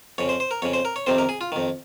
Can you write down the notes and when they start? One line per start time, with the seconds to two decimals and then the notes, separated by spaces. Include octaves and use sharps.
0.18 F2 C#3 C#5
0.29 C5
0.40 C5
0.51 A#4
0.62 F2 C#3 C#5
0.74 C5
0.85 A#4
0.96 C#5
1.07 F2 C3 D#3 C5
1.18 A#4
1.29 G#4
1.41 F4
1.52 F2 D#3